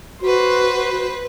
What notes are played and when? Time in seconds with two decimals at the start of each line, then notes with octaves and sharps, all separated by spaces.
0.22 F#4 B4 C5